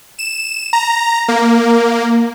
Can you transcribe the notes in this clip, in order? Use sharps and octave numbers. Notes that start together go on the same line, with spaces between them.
E7
A#5
A#3